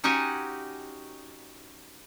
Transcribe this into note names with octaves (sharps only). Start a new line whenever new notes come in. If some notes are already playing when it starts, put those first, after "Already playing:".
C#4 D#4 F#4 G4 F#5 G#5